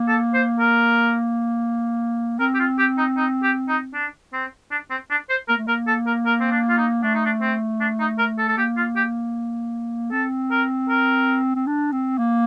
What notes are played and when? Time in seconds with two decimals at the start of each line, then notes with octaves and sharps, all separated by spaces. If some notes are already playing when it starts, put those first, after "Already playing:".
Already playing: A#3
0.08 A4
0.34 C5
0.59 A#4
2.39 C4 A#4
2.54 G4
2.59 F4
2.79 G4
2.98 D#4
3.17 D#4
3.43 G4
3.68 D#4
3.94 D4
4.33 C4
4.71 D4
4.90 C4
5.10 D4
5.29 C5
5.48 A#3 A#4
5.57 A3
5.67 A#3 A#4
5.87 A4
6.06 A#4
6.26 A#4
6.40 C4
6.51 D4
6.69 F4
6.77 D#4
7.03 A3 D4
7.14 D#4
7.25 D4
7.41 C4
7.80 D4
8.00 D#4
8.18 A#4
8.38 A4
8.48 A4
8.57 A#3 G4
8.77 F4
8.96 G4
10.12 C4 A4
10.51 A#4
10.89 A#4
11.55 C4
11.67 D4
11.92 C4
12.18 A#3